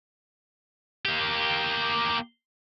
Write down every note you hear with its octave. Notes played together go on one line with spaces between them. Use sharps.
A#3 G4